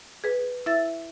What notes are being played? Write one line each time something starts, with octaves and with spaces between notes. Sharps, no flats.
G#4 B4
E4 E5 E6 A6